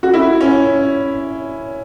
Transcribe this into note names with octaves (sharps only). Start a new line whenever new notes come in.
F#4
E4
C#4